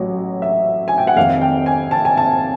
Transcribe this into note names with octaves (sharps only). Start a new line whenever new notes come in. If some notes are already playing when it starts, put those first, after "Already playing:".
Already playing: A1 A2 F#3
E5
G#5
G5
F#5
F1 F2 C3 D#3 F5
G5
G#5
A5
G#5
A5